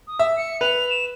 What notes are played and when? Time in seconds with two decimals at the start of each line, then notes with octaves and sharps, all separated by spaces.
0.07 D#6
0.19 E5
0.37 C#7
0.61 B4 F7
0.90 E7